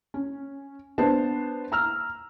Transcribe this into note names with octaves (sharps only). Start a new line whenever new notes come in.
C#4
B3 D4 C5 A5
A#5 E6 F6